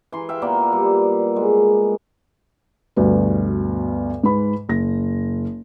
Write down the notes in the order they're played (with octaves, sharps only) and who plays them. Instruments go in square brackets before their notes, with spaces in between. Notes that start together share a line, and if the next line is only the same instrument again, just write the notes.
[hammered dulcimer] E3 C6
E5 F5 G5
A#2 A#3 B3 D5
G3
G#3
[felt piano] D2 G2 B2 B3
G#2 B4 B5
F#1 A#6